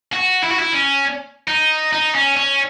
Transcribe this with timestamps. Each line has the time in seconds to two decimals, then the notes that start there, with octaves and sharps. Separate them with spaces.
0.13 F#4
0.43 E4
0.51 F#4
0.59 E4
0.73 C#4
1.48 D#4
1.93 D#4
2.15 C#4
2.37 C#4